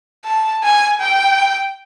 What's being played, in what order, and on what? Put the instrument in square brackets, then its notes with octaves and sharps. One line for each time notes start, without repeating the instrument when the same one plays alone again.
[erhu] A5
G#5
G5